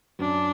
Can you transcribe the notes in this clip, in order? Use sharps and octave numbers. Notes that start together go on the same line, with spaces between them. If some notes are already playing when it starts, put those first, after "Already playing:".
F#2 D4